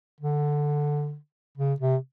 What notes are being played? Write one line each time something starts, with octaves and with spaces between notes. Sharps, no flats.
D3
C#3
C3